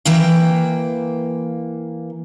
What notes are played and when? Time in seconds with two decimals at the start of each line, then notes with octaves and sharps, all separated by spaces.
0.05 E3 A#3 G5